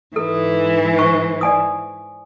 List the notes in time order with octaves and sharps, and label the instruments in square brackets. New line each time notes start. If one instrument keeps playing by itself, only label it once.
[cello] G#2 E3 [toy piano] A4
[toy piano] C5 C#6
D5 G#5 D#6